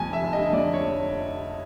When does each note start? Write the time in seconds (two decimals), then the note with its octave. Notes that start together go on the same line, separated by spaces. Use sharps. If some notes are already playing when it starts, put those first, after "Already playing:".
Already playing: F2 G#5
0.09 F1 E5
0.23 F1
0.33 D#5
0.38 D3
0.53 F2 D5
0.73 C#5